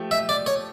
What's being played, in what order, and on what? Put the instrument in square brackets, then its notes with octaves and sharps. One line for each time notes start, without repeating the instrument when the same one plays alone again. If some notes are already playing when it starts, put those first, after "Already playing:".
Already playing: [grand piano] F3 A3 G4
[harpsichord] E5
D5
C#5